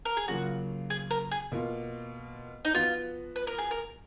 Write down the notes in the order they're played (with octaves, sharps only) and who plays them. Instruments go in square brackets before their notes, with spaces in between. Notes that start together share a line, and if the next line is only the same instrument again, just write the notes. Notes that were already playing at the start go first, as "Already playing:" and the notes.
[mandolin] A#4
G#4
[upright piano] C#3 F#3 A#3 F4 [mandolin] F#4
[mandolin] G#4
A#4
G#4
[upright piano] B2 A#3 F4
[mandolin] D#4
[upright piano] F3 B3 F#4 [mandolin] F4
[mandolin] B4
A#4
G#4
A#4